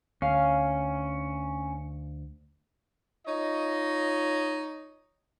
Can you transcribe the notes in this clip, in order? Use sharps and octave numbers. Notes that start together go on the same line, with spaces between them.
D2 C#4 F5
D#4 F4 C#5 D#5